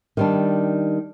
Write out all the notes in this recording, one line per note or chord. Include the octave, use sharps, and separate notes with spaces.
D#3 G3 D4